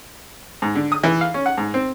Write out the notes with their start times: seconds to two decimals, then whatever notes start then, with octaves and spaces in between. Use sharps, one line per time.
0.62 G#2
0.75 D3
0.92 D#6
1.04 E3
1.21 F5
1.34 C#4
1.46 F#5
1.58 G#2
1.74 C4